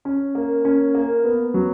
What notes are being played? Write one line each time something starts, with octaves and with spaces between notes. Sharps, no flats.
C#4
A#3
C#4
A#3
B3
F#3